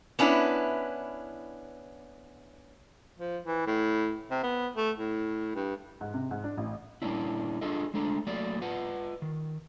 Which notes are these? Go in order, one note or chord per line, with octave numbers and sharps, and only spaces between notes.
B3 C#4 D4 E4
F3
E3
A2
C3
B3
A3
A2
G2
G#2
C3
G#2
D4
A1
A#2 G3 A#3 C#4 D4 E4
D4 F4 G#4 A4 D#5
G#3 A3 D4 A4
F#3 A3 A#3 D5
F4 B4 F#5
D#3